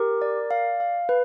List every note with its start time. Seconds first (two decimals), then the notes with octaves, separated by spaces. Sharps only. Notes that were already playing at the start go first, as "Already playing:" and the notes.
Already playing: G4 A#4
0.22 D5
0.51 F5
0.80 F5
1.09 B4